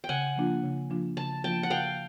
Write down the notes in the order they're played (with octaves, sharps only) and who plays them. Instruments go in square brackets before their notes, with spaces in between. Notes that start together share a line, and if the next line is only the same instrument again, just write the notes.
[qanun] G5
[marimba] C#3 [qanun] F#5 G#5
[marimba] F3 A#3 D4 F4
C#3
F3 A#3 D4 F4
[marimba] C#3 [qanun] A5
[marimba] F3 A#3 D4 F4 [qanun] G5 A5
[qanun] F#5
[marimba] C#3 [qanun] F5 G5